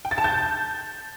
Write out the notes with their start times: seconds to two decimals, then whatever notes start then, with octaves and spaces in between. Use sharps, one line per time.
0.05 G5
0.11 A6
0.18 A5
0.24 G6